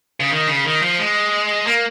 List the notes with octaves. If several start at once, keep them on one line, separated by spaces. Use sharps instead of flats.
C#3
D#3
C#3
D#3
F3
G#3
A#3